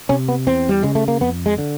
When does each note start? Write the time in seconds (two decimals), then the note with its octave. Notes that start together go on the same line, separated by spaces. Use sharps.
0.09 C3 C#4
0.28 B3
0.47 E2 C4
0.69 G3
0.83 C#3 G#3
0.95 A3
1.08 A#3
1.21 F2 B3
1.46 G#3
1.58 D3